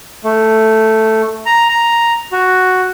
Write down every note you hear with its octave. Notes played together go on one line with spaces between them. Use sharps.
A3
A#5
A#5
F#4